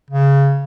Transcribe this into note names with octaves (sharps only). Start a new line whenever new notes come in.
C#3